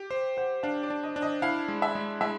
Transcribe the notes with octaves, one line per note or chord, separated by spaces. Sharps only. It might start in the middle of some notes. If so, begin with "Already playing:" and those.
Already playing: G4
C5
C5 F#5
D4 F5
D5
D4
D#5
D4
D#5
E4 F5
G#3
E5
G#3
G#3 E5